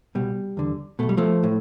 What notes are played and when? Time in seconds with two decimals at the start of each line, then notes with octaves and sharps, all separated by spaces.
0.15 C2 B2 G3
0.57 E2 D3
0.99 B1 B2 A3
1.09 G3
1.17 F3 A3
1.43 A2